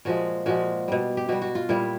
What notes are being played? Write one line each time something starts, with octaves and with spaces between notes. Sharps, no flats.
A#2 F3 G#3 F#4
A#2 F3 G#3 F#4
B2 G3
G4
B2 G3 F#4
F#4
F4
A#2 G3 E4